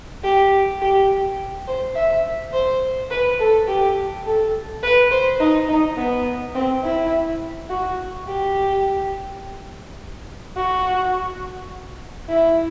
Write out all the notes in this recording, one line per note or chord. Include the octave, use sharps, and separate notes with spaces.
G4
G4
C5
E5
C5
B4
A4
G4
A4
B4
C5
D#4
D#4
B3
C4
E4
F#4
G4
F#4
E4